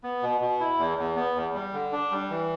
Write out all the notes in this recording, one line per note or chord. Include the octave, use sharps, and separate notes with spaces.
B3
B2
B2
E4
E2
E2
B3
E2
G3
D3
D4
G3
E3